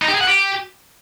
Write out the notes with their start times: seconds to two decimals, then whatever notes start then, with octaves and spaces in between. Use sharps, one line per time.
0.02 D#4
0.08 G4
0.15 G#4
0.21 F#5
0.27 G4